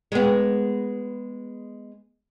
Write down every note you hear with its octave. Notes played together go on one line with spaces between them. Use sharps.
G#3 B3